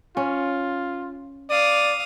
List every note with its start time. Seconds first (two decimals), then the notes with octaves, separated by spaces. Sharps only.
0.17 C#4 F4
1.50 D5 F5 D#6